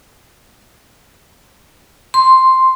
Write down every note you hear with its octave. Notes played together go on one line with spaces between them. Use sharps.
C6